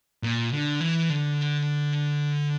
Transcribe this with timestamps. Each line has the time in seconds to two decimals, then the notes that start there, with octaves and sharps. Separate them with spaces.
0.23 A#2
0.52 D3
0.81 E3
1.10 D3